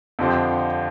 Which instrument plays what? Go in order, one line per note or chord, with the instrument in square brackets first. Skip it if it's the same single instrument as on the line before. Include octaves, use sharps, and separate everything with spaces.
[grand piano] F2 D3 F3 C4 G4